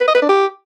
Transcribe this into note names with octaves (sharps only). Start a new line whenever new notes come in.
B4
D#5
B4
D4
G4